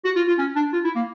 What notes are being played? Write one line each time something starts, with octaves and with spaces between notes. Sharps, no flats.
F#4
F4
F4
C#4
D4
F4
E4
A#3